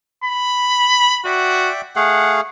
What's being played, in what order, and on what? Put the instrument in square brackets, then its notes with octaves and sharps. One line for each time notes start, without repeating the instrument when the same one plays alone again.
[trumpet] B5
[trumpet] F#4 [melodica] D5 E5 G5
[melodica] A3 G#4 F5 [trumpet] F#5